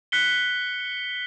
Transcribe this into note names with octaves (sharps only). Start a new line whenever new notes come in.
F#6 B6 C#7 G7